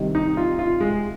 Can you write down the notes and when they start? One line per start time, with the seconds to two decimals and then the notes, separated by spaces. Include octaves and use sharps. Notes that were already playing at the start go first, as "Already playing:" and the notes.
Already playing: C2 C3 D#3 C4
0.15 D#4
0.37 F4
0.59 F4
0.80 G#3